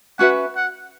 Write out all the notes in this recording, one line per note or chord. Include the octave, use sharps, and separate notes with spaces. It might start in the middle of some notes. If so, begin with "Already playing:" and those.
C#4 F#4 B4 E5 F#5
F#5